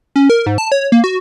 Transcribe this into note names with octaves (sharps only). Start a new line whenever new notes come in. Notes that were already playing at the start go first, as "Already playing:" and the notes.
C#4
A#4
G#2
A5
C#5
A#3
F#4